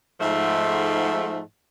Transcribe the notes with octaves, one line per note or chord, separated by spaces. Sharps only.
G#2 F3 A3